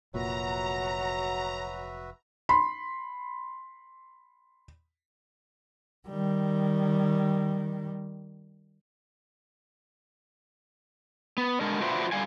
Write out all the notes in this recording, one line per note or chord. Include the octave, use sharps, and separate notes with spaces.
F1 A#2 F#3 F#4 B4 E5 A#5
B5 C6
D#3 G3
B3
D3 G#3 D4 A#4
D4 F4 F#4 B4 C5 E5
D3 G3 F5 G#5